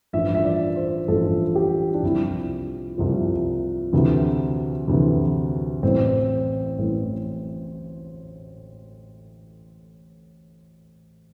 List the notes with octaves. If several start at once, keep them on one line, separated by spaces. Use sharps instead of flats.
A1 G2 F3 E5
E5
D5
C5
A1 G2 F3 A4
G4
D4
C2 C3 F3 E4
C2 C3 F3
D2 C3 E3
D2 C3 E3
A1 A2 E3 C4
A1 A2 E3